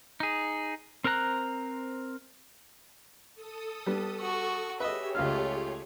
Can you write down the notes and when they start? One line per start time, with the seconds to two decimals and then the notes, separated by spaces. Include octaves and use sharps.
0.20 D#4 G#4
1.04 C4 A#4 C5 A#5 F#6
3.35 A4 D#6
3.86 G3 B3
4.20 F#4 C#6
4.80 G4 G#4 B4 C#5 D#5 E5
5.15 C#2 A3 F4 F5 F6